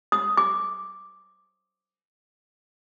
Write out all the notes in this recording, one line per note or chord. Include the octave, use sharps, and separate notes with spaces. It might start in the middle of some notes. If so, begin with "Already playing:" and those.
D#6
D6